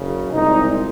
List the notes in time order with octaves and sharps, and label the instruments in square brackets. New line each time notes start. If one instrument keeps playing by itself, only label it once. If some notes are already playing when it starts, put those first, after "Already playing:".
Already playing: [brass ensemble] F#1 F#2 C#3
C2 A#2 G#3 D#4